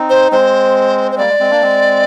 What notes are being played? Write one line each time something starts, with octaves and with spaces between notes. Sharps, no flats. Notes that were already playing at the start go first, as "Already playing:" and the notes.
Already playing: C4 D#4
C5
G#3 C4 C5
C5
G3 A#3 D5
G#3
G#3 C4
A#3 D4
G#3 C4